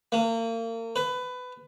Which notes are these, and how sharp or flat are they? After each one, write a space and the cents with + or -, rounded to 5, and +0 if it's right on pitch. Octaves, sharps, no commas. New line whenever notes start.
A#3 -35
B4 +20